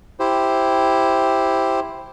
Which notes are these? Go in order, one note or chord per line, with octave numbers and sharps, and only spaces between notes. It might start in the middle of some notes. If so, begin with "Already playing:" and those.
E4 G4 C5